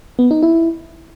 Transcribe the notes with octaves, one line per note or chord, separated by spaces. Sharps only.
B3
D#4
E4